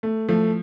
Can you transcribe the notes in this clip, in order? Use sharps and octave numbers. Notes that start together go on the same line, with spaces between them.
A3
F3 A3